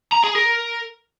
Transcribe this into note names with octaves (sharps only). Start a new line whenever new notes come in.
A#5
G#4
A#4